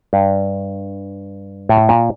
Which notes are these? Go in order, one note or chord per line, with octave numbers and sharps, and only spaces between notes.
G2
A2
A#2